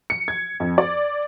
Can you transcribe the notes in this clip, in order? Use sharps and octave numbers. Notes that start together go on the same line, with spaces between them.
C#7
G#6
F2
D5